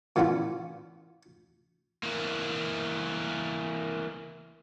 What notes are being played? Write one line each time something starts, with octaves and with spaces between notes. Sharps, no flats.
A#2 E3 B3 C#4 E4 F4
E3 A#3